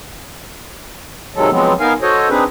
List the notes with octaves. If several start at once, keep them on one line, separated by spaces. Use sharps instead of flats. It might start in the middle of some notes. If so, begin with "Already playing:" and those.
C3 D#3 F#3 G#3 A4
F3 F#3 G#3 B3 C4
B3 D#4 A#4 F5 G#5
F#4 A4 C5 C#5 D#5
C4 D4 D#4 G#4 B4